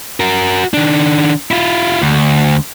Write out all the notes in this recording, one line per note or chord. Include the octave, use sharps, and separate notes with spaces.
F#4 A#4
D#3 D4
E4 F4
D2